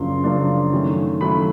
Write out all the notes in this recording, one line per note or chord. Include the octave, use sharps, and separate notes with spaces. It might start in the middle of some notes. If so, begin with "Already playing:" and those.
Already playing: F#2 C#3 F3 A#3 D4 C6
F#2 C#3 F3 A#3 D4
D#3 F#3 A3 C#4
D#3 F#3 A3 C#4 B5